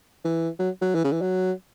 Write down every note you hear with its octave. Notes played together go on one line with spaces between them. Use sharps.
E3
F#3
F#3
E3
C#3
E3
F#3